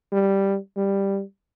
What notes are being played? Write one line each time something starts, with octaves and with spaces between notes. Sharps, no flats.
G3
G3